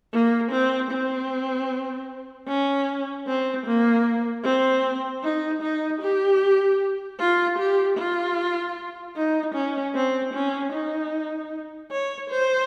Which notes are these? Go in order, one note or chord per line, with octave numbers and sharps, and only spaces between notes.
A#3
C4
C4
C#4
C4
A#3
C4
D#4
D#4
G4
F4
G4
F4
D#4
C#4
C4
C#4
D#4
C#5
C5